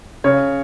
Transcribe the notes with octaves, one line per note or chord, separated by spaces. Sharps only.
C#3 C#5